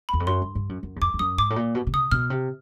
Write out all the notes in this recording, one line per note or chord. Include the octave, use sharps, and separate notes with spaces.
E2 B5
F2
F#2 C6
G2
G2
F#2
F#2
E2
F2 D6
F2
F#2 D#6
G#2 D6
A2
A#2
B2
B2
C3 D#6
B2 F6
C3